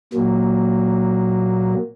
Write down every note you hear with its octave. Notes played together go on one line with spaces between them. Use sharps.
A#2 F#3 A#3